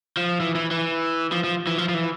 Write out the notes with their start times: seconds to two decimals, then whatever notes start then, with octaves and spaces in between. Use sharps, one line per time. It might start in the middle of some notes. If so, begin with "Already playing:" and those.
0.17 F3
0.40 E3
0.55 E3
0.71 E3
1.32 F3
1.44 F3
1.67 E3
1.78 F3
1.89 F3
1.94 E3